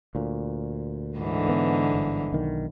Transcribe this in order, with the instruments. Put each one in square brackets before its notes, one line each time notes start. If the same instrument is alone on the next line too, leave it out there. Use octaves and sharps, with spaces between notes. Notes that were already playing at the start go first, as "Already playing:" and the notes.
[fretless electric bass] D2 A#2
[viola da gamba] G#2 D3 E3
[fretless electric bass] B3
G1
B1 D#3